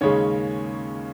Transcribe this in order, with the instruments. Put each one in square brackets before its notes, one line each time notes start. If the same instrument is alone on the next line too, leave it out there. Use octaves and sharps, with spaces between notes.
[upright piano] D#2 C#3 G#3 C#4 C#5